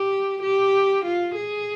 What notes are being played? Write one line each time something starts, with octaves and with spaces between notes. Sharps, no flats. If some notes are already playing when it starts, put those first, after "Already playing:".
Already playing: G4
G4
F4
G#4